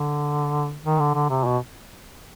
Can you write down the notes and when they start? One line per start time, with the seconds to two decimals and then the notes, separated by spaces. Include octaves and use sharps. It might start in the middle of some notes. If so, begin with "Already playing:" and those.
Already playing: D3
0.85 D#3
0.99 D3
1.14 D3
1.30 C3
1.45 B2